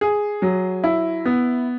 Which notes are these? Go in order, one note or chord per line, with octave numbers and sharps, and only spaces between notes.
G#4
F#3
E4
B3